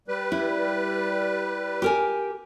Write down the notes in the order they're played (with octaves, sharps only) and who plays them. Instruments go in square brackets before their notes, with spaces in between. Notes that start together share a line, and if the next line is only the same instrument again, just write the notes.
[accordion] G3 B4
[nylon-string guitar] E4
G4 A#4 G#5